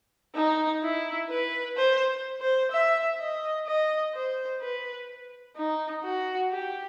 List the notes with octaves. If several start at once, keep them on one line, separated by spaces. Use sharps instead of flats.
D#4
E4
B4
C5
C5
E5
D#5
D#5
C5
B4
D#4
F#4
G4